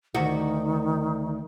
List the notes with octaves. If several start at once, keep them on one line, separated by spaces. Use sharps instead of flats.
D2 D#3 F#4